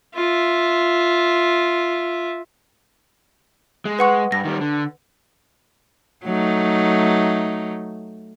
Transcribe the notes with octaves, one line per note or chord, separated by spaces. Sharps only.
F4 E5
G#3
B4 F#5 C#6
G2 A#6
D#3 G3
D3
F#3 A3 D#4